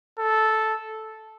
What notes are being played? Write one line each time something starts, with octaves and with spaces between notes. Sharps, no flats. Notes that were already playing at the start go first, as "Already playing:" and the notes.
A4